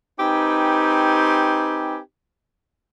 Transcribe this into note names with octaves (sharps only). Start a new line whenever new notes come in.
C4 D#4 G4 B4 G#5